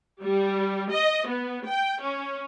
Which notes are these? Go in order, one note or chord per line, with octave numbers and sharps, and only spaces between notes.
G3
D#5
B3
G5
C#4